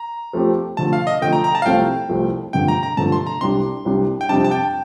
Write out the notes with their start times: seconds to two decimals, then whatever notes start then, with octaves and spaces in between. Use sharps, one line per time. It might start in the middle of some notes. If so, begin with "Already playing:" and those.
Already playing: A#5
0.33 F3 A3 C4 G4
0.77 D3 F3 A3 A5
0.93 F5
1.07 D#5
1.22 D3 F3 A3 G5
1.33 A#5
1.44 A#5
1.55 A5
1.62 F5
1.66 C2 C3 F3 A3 C4 G5
2.09 C2 C3 F3 A3 C4
2.53 G2 D3 F3 A3 G5
2.68 A#5
2.83 A#5
2.97 G2 D3 F3 A3 A5
3.12 C6
3.27 A#5
3.41 C2 C3 G3 D4 C6
3.85 C2 C3 G3 D4
4.21 G5
4.29 F2 C3 G3 D4 A5
4.44 A5
4.51 G5